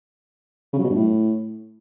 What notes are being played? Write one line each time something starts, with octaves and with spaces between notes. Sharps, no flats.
C#3
F#3
B2
G2
A2